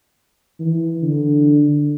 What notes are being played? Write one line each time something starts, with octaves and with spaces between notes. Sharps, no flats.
E3
D3